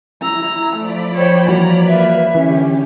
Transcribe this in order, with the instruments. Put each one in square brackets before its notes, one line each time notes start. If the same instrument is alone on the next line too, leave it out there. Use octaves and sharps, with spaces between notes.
[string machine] E4 [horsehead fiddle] A#5 [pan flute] E6
[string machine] F3 D5 B5 [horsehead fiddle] A3
[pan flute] C5 [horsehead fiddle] C#5 G5
[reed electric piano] E3 G3 F#4 [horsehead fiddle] A#3 A#5 [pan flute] C#5
[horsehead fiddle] A#3 B4 [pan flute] E5
[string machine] D3 G4 [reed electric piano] E3 [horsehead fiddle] C#4